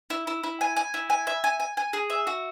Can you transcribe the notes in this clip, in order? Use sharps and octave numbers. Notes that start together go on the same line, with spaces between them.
E4
E4
E4
G#5
G#5
E4
G#5
E5
G#5
G#5
G#5
G#4
E5
F#4